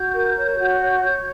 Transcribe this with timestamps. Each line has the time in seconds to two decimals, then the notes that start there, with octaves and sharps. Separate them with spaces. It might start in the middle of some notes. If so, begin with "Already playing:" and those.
Already playing: F#4 G6
0.13 A#4
0.36 C#5
0.59 F#4
0.80 C#5
1.04 C#5